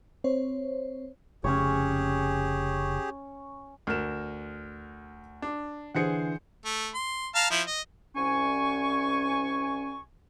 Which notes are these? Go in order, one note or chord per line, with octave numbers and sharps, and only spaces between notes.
C4 C5 C#5
F1 C#3 C#4 G4 G#4 C#5
D2 A#4 F6 E7
D4
D3 E3 G#4 C5 F#5 C#7
A3
C6
F5 A5 A#5
F3 E4
D#5
C2 C#4 G#5 C#6